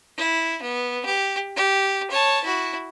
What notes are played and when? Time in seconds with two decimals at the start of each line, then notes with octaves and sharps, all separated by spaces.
0.17 E4
0.62 B3
1.05 G4
1.56 G4
2.10 C#5 A5
2.44 E4 F#4